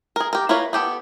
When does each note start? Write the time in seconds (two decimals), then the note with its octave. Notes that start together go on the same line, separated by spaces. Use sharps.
0.16 G#4 A#4
0.33 G4 A#4
0.49 E4 F4 A#4 B4 C#5
0.73 B3 G4 A4